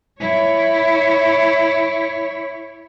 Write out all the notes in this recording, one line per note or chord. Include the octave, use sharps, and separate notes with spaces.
E4 C#5